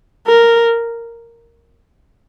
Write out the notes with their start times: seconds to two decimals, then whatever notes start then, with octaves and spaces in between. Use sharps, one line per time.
0.27 A#4